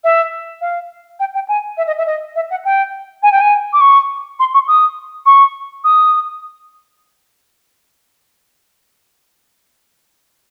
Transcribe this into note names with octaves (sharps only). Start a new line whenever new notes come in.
E5
F5
G5
G5
G#5
E5
D#5
E5
D#5
E5
F#5
G5
G#5
G5
G#5
D6
C#6
C6
C#6
D#6
C#6
D#6